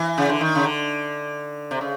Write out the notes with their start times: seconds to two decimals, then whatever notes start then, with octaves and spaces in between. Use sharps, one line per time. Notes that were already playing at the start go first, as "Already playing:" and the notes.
Already playing: E3
0.18 C#3
0.29 D3
0.41 D#3
0.55 C#3
0.64 D3
1.71 C3
1.81 C#3